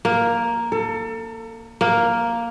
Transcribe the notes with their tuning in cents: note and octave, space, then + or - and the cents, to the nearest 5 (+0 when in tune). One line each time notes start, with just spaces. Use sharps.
A#3 +0
A4 +30
A#3 +0